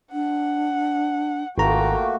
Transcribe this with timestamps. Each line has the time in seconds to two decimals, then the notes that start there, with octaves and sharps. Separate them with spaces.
0.12 D4 F#5
1.58 G#1 A3 A#3 F4 F#4 G5 A#5